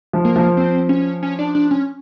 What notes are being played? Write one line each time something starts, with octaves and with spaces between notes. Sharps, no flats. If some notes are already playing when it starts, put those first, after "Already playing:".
F3
A#3
F3
C4
C#4
C#4
D4
D4
C#4